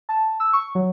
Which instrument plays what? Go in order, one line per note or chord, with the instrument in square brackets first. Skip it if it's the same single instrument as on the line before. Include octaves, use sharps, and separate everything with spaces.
[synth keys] A5
E6
C#6
F#3